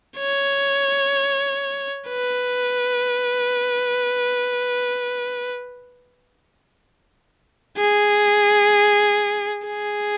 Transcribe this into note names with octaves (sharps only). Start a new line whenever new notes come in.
C#5
B4
G#4
G#4